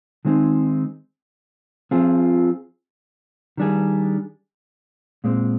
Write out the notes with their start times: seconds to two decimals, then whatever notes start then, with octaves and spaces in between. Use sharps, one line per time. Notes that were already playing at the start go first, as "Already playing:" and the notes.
0.25 D#3 G#3 C4 D#4 G#4
1.91 F3 C4 F4 G#4
3.58 D#3 G3 D4 G#4
5.24 A#2 G#3 C4